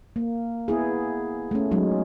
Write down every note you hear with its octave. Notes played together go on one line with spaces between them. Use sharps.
A#3
B3 E4 G#4
A3 C#4
F#3 G#3 C#4 D#4